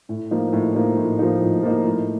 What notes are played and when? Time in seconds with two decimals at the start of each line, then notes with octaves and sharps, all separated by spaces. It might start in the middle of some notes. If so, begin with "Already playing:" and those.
0.09 A2
0.31 F3 A#3 D#4
0.53 A2
0.75 F3 A#3 D#4
0.96 A2
1.19 F3 A#3 D#4
1.42 A2
1.63 F3 A#3 D#4
1.86 A2